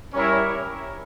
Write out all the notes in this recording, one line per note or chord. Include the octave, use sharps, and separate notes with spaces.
G3 C#4 E4 A#4 C#5